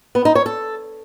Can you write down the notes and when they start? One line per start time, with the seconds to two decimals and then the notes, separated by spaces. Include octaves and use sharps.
0.15 B3
0.25 D#4
0.35 C#5
0.46 A4